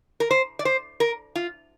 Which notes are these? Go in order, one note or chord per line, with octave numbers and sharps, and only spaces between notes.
A#4
C5
D5
C5
A#4
F4